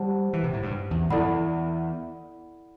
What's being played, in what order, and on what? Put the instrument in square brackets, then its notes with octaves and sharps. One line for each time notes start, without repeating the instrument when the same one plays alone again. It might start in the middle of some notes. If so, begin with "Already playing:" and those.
Already playing: [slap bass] G3 [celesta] G4 C5 F#5 A5
[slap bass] E3
C3
A2
G2
E2
[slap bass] E2 [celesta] E4 A4 D5 F#5 B5